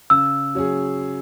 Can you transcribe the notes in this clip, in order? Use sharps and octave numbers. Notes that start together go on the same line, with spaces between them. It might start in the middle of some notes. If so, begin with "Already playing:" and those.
C#3 E6
F#3 C#4 G#4